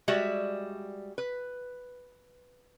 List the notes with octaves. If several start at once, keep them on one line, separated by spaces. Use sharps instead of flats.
G3 G#3 F#4 D5 E5
B4